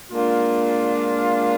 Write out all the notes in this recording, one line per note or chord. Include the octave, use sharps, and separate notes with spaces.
A#2 G#3 D4 F4